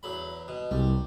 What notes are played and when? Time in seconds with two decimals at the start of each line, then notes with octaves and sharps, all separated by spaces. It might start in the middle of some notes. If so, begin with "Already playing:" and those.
0.03 E2 F#3 B5
0.48 B2
0.71 C2 G3